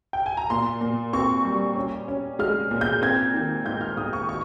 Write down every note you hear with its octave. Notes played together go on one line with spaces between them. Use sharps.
G5
G#5
A#5
A#2 C6
A#2
C4 C#6
G3
C#4
C#4
G#3 F6
A#2
G6
C4 G#6
D#3
G#2 G6
F6
G#2 D#6
C#6
C#6